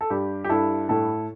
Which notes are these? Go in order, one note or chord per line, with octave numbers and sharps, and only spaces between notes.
A4
G2 G4
G4
G2 E4 A4
A2 E4 A4